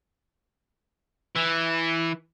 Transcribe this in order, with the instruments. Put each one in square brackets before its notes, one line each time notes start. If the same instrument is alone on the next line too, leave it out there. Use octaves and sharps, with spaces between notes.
[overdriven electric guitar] E3